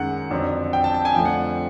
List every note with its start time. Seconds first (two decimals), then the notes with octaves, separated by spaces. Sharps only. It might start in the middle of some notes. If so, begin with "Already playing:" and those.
Already playing: F#2 D#3 G#3 F#5
0.30 F2 D3 F#3
0.73 G5
0.84 A5
0.94 A5
1.05 G#5
1.15 F2 D3 F3 A3 G5
1.25 F#5